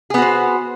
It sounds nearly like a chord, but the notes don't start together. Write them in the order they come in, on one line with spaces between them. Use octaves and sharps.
G#4 B3 F#4 C5